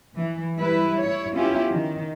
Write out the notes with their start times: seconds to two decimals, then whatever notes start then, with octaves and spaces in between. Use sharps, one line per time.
0.16 E3
0.56 G3 E4 B4
1.00 E4 C#5
1.34 B3 C#4 E4 F4 G4
1.70 D#3